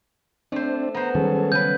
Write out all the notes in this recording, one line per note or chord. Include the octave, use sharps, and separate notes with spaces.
A3 C4 D4 C5
B3 C5 A#5
D#3 F#3 G3 C#4 G#4 A4
C#3 B4 G6